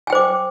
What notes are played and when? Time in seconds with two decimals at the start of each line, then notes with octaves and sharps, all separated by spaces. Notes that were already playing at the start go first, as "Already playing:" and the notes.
0.07 G#5
0.10 G5
0.13 C5
0.15 D6